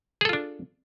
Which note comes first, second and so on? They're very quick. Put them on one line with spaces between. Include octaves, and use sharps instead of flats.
G#4 A4 F4 D4